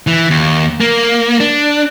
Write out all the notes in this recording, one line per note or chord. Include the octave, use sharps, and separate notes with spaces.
E3
D#2
A#3
D4